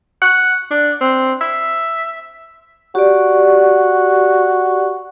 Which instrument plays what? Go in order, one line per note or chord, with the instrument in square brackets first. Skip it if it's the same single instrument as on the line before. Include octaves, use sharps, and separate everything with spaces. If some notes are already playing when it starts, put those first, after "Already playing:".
[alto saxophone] F#5
D4
C4
E5
[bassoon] F#4 [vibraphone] G4 D5